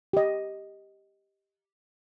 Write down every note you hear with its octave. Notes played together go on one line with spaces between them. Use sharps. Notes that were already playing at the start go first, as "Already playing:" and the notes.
G4 D#5